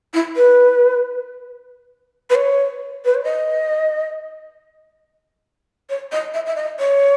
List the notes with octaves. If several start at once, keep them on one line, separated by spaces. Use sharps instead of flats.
E4
B4
B4
C#5
B4
C#5
D#5
C#5
D#5
E5
E5
D#5
C#5